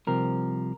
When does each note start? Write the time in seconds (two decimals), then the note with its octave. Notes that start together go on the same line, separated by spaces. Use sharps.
0.07 C2 C3 F3 C4 A#4